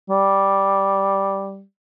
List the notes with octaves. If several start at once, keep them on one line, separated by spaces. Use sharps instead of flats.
G3